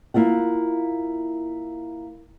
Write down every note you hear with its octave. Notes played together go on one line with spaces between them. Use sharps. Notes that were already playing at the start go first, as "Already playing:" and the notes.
A#3 E4 F4 F#5